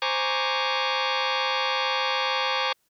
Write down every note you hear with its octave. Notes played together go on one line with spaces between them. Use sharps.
C5 G#5 A#5 C#6 D6